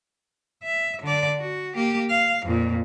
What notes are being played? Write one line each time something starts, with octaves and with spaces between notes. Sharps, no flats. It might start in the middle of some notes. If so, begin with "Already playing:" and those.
E5
D3 D5
F#4
A#3 G4
F5
F2 A#2